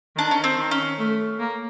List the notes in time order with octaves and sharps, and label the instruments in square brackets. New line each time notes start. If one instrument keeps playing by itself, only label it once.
[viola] D#3 [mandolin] D4
[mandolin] C#4
C4
[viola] D#3
[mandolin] C#4
[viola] A3
A#3